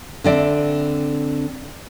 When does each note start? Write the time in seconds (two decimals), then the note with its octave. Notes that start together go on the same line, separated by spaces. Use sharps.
0.24 D3 C4 D5 E5